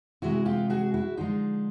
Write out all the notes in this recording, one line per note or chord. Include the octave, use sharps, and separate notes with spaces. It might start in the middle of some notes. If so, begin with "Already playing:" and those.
C3 E3 G#3 E4 F#4
F4 G4
F#4 G#4
E4 F#4
D3 F3 G#3 D#4 F4